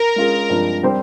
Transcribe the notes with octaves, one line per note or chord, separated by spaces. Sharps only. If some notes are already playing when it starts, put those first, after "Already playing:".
Already playing: A#4
G#3 C#4 F4 G#4
G2 F3 G#3 C4
G3 C4 G4 C5